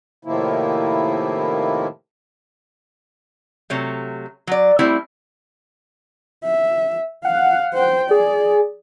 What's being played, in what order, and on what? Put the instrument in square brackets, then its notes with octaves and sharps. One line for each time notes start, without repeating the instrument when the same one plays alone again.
[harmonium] A2 C3 D#3 F3 A#3 E4
[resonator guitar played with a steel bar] C3 F#3 A3
F#3 D5
G3 A3 C4 E4
[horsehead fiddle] E5
[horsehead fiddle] F5 [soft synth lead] F#5
[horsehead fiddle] C5 G5
[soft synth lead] G#4 [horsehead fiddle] D5